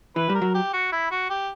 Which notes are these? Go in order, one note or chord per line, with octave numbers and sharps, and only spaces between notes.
E3 B4
G3
A#4
F#3
G4
F#4
E4
F#4
G4